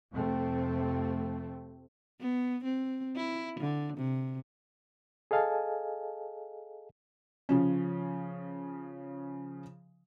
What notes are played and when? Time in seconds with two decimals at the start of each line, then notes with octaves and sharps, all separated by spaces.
0.12 F2 C3 A3 C4
2.20 B3
2.64 C4
3.16 E4
3.60 D3
3.98 C3
5.31 G#4 A4 D#5 F5 G#5 A5
7.49 C#3 F3 C#4